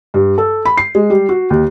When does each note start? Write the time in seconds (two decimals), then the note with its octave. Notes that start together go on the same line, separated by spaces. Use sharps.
0.14 G2
0.38 A4
0.65 B5
0.77 C7
0.95 G#3
1.10 G3
1.29 F#4
1.50 D#2